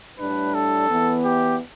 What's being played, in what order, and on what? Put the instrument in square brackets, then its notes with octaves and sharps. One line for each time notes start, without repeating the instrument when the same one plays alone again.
[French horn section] A2 G3 D4 [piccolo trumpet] B4
[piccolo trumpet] A4
[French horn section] E2 E3 B3
[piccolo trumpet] G4